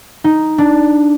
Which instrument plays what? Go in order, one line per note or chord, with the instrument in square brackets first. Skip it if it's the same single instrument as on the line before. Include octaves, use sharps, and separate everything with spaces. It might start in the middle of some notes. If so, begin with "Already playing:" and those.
[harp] D#4
D4